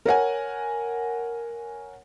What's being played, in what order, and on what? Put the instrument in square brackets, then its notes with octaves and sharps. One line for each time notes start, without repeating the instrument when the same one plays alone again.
[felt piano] A#4 C#5 F#5 G#5